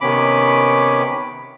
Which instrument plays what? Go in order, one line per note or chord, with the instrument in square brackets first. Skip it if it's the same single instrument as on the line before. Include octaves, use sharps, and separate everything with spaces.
[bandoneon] C3 D#3 B3 C#4 B5 D6